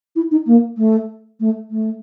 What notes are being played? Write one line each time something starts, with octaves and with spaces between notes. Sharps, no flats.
E4
D#4
A#3
A3
A3
A3